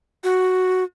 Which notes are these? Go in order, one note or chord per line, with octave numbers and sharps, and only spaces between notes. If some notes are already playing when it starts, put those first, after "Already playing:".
F#4